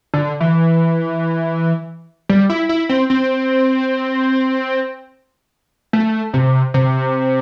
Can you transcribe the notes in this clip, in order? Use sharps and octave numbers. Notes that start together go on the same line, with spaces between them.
D3
E3
G3
E4
E4
C4
C4
A3
C3
C3